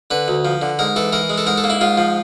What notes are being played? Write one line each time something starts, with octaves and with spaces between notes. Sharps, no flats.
D3 B4
D2
F3
D3
G#2 A#4
E3 A4
E3 A#4
G#3
A4
G#2 A#4
A4
A#3
E4
G#2 F4
F3